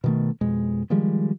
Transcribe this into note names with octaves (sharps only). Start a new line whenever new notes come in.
B2 D#3 A3
F2 B2 G#3
D#3 F3 G3 G#3